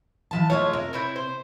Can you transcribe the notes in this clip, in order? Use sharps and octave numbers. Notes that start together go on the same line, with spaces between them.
E3 F3 A5
G#3 A3 F4 C#5
C3 A#4
C4 E4 C#5
C5